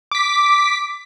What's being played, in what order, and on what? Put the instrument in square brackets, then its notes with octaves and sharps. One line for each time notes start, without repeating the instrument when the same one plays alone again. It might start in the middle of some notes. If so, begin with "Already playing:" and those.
[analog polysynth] D6 B6